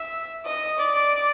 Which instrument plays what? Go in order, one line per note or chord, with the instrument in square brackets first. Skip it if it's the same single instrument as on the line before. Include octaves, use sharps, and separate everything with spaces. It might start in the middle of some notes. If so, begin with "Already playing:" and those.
Already playing: [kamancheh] E5
D#5
D5